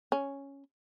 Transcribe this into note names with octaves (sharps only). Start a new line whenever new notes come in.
C#4